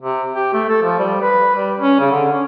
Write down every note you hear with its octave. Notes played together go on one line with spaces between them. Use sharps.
C3
G4
A3
A4
F3
G3
B4
G3
C#4
C#3
D3
C#4